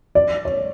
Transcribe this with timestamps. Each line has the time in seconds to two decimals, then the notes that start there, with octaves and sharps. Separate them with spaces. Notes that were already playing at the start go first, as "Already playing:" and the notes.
0.15 D5
0.45 C#5